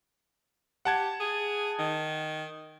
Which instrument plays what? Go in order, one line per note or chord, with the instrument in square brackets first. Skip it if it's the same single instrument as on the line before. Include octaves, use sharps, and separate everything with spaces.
[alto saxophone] G4 [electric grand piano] F#5 A5 G#6
[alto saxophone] G#4
D#3